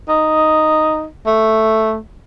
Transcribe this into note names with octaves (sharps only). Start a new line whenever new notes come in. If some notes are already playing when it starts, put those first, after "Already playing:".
D#4
A3